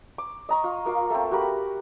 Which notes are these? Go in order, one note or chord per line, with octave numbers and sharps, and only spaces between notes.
D6
D#5 A#5 C#6
F4
A#3 F4 F5 D6
A3 A#3 C4
F#4 G4 A#4 B5